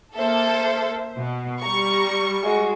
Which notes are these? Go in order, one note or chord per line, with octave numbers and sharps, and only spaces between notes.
A#3 A4 C5 E5
B2
G3 A#5 C#6
G#3 F#4